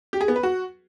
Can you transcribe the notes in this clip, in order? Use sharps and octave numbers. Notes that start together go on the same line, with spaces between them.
G4
G#4
B3
B4
F#4